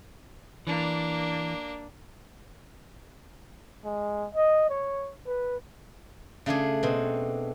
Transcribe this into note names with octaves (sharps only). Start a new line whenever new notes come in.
E3 A#3 D4
G#3
D#5
C#5
B4
C#3 A3 D4 G#4
B2 C4